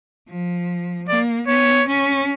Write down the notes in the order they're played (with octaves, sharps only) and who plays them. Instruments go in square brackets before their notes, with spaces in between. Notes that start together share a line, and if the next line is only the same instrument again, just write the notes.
[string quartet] F3
[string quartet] A#3 [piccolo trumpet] D5
[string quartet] B3 [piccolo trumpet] C#5
[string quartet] C#4